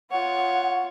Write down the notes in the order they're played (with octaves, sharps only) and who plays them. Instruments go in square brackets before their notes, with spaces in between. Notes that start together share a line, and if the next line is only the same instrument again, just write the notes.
[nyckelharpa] F4 C#5 [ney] F#5